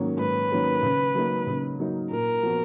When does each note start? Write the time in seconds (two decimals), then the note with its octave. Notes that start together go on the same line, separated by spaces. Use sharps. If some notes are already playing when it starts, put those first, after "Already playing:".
Already playing: G#2 D#3 F#3 A#3 C#4
0.19 G#2 B4
0.50 D#3 F#3 A#3 C#4
0.83 C#3
1.15 F#3 A#3 D#4
1.47 C#3
1.79 F#3 A#3 D#4
2.11 A#2 A#4
2.43 F3 B3 F#4